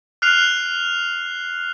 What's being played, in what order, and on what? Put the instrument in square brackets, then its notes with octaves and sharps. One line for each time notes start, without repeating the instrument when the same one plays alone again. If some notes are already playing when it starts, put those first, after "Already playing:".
[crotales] F6 F#6 C7 F7